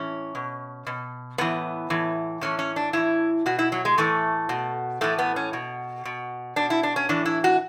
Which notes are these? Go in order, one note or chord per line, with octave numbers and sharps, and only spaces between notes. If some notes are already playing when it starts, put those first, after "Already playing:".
Already playing: A2 E3 C#4
B2
B2
A2 E3 B3
A2 E3
A2 E3 C#4
C#4
D4
A2 E3 E4
B2 F#4
E4
F#3
G#3
A2 E3 A3
B2
A2 E3 A3
B3
C#4
B2
B2
B2 D4
E4
D4
C#4
A2 E3 D4
E4
F#4